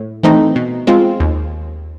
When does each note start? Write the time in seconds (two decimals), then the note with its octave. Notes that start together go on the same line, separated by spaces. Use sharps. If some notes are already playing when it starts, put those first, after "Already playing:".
Already playing: A2
0.23 E3 A3 C4 D#4
0.56 B2
0.87 G#3 C4 F4
1.20 D#2